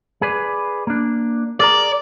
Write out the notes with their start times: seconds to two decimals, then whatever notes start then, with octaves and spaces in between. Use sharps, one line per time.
0.22 G#4 B4 D5
0.87 A#3 D4
1.60 G#4 A#4 D5 A#5